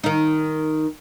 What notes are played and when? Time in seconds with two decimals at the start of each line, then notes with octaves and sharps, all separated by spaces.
0.04 D#3 D#4